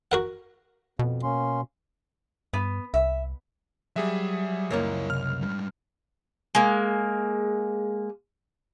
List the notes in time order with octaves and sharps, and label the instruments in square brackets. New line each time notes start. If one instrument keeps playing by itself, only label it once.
[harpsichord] F#4 A#4 F#5
[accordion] F2 [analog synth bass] B2
[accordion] A#3 C#4 C6
[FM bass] G2 [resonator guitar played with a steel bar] B3
[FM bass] C2 [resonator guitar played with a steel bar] E5
[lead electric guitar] F#3 [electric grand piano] G3 G#4 E5
[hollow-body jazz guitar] C#2 F#2 A#3 [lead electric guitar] E4 A#4
[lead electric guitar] C2 [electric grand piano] F6
[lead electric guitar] G#2 G3
[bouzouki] G#3 A#3